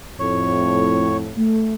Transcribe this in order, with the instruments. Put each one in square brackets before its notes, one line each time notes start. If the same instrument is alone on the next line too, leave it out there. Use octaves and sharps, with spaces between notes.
[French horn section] F2 A2 [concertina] C#5
[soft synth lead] A3